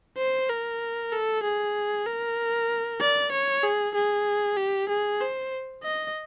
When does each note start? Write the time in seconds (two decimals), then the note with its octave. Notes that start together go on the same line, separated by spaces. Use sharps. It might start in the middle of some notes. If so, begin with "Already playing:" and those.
0.18 C5
0.49 A#4
1.12 A4
1.43 G#4
2.07 A#4
3.00 D5
3.32 C#5
3.63 G#4
3.95 G#4
4.57 G4
4.89 G#4
5.21 C5
5.83 D#5